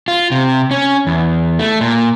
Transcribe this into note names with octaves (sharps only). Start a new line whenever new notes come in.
F4
C3
C#4
E2
A3
A#2